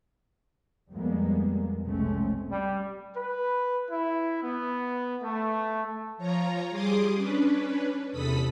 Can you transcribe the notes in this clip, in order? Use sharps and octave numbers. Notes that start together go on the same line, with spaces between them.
F2 G3 G#3 A#3 B3
F1 B1 G#3 A3 C4 C#4
G3
B4
E4
B3
A3
F3 F4 C#5 A#5
G3 G#4 C6 D6 D#6
C#4 D4 B4
E2 C3 A4 B5 D#6 B6